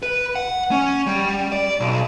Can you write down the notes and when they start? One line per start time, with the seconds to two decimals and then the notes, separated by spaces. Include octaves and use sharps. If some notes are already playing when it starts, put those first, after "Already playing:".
0.03 B4
0.36 F#5
0.71 C#4
1.07 G3
1.52 D5
1.80 B1